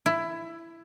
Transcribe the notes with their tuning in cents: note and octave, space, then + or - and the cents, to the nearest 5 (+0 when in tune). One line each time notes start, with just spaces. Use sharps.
E4 +15